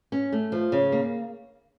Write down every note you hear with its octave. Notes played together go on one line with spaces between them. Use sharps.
C#4
A3
F3
C#3
A#3